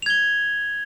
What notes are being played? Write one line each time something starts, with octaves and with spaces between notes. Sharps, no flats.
G#6 F7 G7